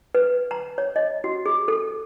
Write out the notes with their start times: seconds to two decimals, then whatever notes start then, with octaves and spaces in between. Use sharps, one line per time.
0.15 B4
0.51 A#5
0.78 C#5
0.96 D#5
1.24 F#4
1.46 G#4
1.68 A4